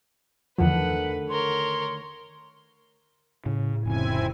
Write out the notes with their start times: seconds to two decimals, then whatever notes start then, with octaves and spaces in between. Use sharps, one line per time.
0.58 E2 D3 D#3 F3 A3 B4 F#5
1.29 A#4 C#5 C6
3.46 A2 C#3
3.85 F1 C#3 C4 E4 G#5